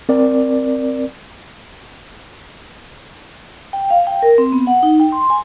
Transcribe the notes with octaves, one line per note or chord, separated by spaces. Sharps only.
C4 A#4 D5
G5
F5
G5
A#4
C4
B3
F#5
D#4
G5
C6
G#5